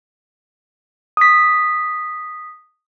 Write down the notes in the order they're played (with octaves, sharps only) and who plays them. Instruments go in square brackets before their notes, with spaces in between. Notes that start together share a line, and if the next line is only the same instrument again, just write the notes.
[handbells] D#6 B6